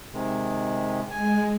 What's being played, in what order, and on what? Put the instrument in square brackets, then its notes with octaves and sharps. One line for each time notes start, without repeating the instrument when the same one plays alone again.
[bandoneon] C3 D#3 G#3
[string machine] G#3 [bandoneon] G#5